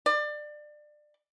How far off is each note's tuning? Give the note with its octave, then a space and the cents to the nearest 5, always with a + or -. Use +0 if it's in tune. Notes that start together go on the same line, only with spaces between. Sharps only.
D5 +25